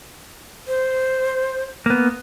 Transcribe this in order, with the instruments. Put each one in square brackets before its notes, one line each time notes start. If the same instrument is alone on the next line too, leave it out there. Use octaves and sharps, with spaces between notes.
[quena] C5
[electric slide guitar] A#3 B3